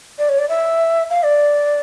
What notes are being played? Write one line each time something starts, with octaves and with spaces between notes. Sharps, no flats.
D5
C#5
D5
E5
F5
D5